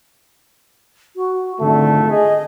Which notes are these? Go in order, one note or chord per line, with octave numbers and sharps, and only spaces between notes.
F#4
G#1 F2 D3 A3
G#4 D#5